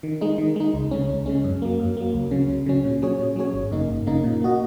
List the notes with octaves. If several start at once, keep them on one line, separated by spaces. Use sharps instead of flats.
D#3
G#3 D#4
D#3
G#3 D#4
C#2
C#3 G#3 C#4
C#2
C#3 G#3 C#4
F#2
F#3 A#3
F#2
F#3 A#3
C#2
C#3 F#3 C#4
C#2
C#3 F#3 C#4
A#2
F#3 C#4 G#4 C#5
A#2
F#3 C#4 G#4 C#5
G#1
F#2 C#3 A#3 D#4
G#1
F#2 C#3 A#3 D#4
A#2
A#3 F#4 D#5